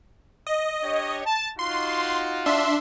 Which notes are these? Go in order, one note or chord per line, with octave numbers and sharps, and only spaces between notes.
D#5
D4 G4 C#5
A5
D#4 F4 F#4 C6
D4 E5 C6